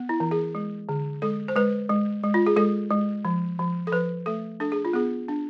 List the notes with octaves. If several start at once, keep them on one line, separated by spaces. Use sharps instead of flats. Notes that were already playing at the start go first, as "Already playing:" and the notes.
Already playing: B3
E4
E3
G#4
G#3
D3
G#3 A4
C5
G#3 B4
G#3
G#3
F4
G#4
G#3 A4
G#3
F3
F3
A4
F3 B4
A3 A4
D4 A4
G#4
F4
B3 G#4
D4